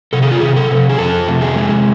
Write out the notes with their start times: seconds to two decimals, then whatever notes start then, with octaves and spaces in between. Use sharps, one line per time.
0.13 C3 A4
0.23 G#4
0.31 F4
0.40 C3 G#4
0.56 A4
0.71 C3
0.89 G#4
0.98 F2 A4
1.28 C3
1.41 G#4
1.56 G#3